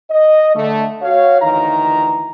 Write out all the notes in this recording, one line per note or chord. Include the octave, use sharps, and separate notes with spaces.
D#5
D3 A3
F#4 C#5 F5
D2 D#3 E3 A#5